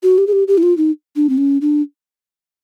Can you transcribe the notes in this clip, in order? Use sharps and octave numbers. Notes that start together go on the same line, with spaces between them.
F#4
G4
G#4
G4
G4
E4
F4
D#4
D4
C4
C#4
D4